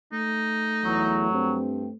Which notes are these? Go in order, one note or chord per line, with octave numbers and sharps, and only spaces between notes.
A3 D#4
E2 E3 F#3
G2 C4